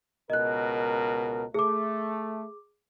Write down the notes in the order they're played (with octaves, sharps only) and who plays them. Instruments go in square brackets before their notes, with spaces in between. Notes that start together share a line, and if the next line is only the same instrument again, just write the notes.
[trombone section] C#2 B2 A#4 [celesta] D#5 F#6
[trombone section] A3 [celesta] G#4 D6